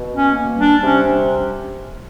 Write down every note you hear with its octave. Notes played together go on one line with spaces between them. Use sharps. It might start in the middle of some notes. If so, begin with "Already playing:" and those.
Already playing: B2
C#4
A#3
G3
D4
C3 C#4